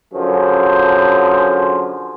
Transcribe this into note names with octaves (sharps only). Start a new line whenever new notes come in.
F#2 D3 F3 G#4 C5